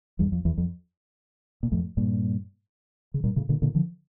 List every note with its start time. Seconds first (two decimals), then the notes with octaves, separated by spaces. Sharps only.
0.19 E2 G2
0.32 F2
0.45 E2
0.58 F2
1.63 A#2
1.72 F2 A2
1.97 G2 A#2
3.14 C#3
3.24 G2 A#2
3.36 A2 C#3
3.49 A#2 D3
3.62 A#2 D3
3.75 D3 F3